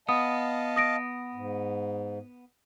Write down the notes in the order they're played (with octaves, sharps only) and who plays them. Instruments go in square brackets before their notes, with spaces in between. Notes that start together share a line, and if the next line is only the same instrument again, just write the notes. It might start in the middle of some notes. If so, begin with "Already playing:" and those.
[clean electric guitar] B3 [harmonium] D#5 F5 A5 [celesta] D#6
[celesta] D#6 A#6 D7
[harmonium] G#2